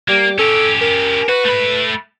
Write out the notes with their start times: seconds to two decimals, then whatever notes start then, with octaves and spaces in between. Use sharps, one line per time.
0.09 G3 A#3
0.39 C#4 G4 A4
0.81 A#4
1.28 F#4 B4
1.45 A3 B5